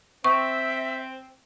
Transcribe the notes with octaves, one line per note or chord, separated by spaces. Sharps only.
C4 E5 C#6